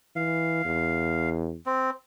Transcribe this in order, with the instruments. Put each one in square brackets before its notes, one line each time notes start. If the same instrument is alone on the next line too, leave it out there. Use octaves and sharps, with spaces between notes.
[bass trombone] E3 [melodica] F5
[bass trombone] E2
[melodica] C4